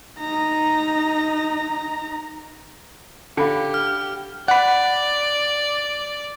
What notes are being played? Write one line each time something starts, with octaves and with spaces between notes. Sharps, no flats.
D#4 A#5
D3 G4 F5 B5 C#7
F6
D5 F#5 B5